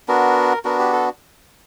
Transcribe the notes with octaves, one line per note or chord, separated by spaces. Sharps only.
B3 D4 F#4 A#4
B3 D4 F#4 A#4
G4
A4